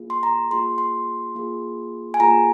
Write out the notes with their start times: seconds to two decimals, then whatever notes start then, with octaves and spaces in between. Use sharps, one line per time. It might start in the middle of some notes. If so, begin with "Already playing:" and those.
Already playing: A#3 F4 G#4
0.10 C6
0.23 A#5
0.51 A#3 F4 G#4 C6
0.78 C6
1.35 A#3 F4 G#4
2.14 G#5
2.20 A#3 F4 G#4 A#5